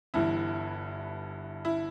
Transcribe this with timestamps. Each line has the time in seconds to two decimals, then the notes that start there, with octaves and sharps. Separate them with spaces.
0.14 G1 G2 E3 E4
1.65 E4